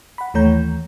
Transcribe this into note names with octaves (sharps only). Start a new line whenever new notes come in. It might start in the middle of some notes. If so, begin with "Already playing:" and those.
F#5 B5
D#2 E3 A3 C#5 A#5 G6